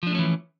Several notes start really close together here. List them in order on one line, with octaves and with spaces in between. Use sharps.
F3 D4 A3 C#4 E3